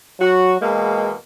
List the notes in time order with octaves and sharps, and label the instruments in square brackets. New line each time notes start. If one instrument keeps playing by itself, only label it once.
[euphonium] F#3 [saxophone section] F#4
[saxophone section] E2 B2 A#3 [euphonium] G#3